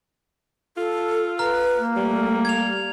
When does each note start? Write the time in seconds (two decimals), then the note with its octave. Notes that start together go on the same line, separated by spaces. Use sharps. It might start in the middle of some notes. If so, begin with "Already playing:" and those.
0.77 F4 A4
1.39 B4 A#5 F6
1.77 A#3
1.96 G3 A3
2.45 G#6 F7